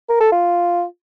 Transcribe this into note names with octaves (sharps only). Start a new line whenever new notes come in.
A#4
A4
F4